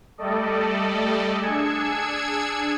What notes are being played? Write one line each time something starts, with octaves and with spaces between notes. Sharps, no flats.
G3 A3 A4 D5 D#5
D4 G#4 E6 G#6 C#7